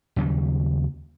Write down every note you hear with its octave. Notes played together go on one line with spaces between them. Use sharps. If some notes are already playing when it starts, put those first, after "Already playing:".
D#2 C#3 F#3 G3